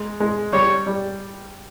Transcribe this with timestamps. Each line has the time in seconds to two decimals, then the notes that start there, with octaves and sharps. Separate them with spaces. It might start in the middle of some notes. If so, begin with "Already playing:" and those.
Already playing: G#3
0.20 G#3
0.53 G3 C#5
0.86 G3